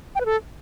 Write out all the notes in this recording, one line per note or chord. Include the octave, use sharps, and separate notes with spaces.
G5
B4
A4